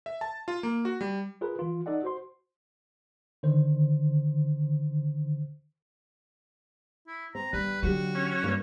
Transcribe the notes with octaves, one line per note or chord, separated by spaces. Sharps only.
E5
A5
F4
A#3
F#4
G3
F4 G#4 A#4 B4
E3 F4
D#4 A4 D5 D#5 F#5
F#4 C5 C6
D3 D#3 C5
E4
C4 A#5
G1 G3 B4
D3 F#3 F#4 G4
C#4
G2 E3 A#3